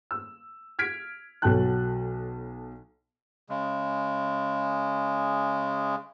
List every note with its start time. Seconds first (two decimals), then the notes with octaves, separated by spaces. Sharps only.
0.11 E6
0.79 F6 G#6 B6 D7
1.42 B1 F#3 A4 G5 A5 F#6
3.49 C#3 G#3